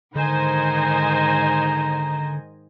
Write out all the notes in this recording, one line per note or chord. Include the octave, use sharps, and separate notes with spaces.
G#2 D3 D#3 C5 D#5 G#5 A#5